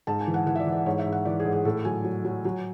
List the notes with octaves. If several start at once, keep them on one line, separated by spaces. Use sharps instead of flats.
G#2 A5
G#5
E3
F#5
E3 F#5
E5
D5
E3
D5
G#2 C#5
E5
G#2
F#5
E3 D5
G#4
G#2
G#4
A2 A4
F#3 G#5
F#3
F#3
F#3